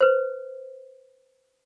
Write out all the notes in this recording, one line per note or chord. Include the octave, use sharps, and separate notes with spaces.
B4 C5